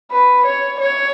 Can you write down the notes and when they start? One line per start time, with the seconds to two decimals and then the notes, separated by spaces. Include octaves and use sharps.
0.12 B4
0.45 C#5
0.80 C#5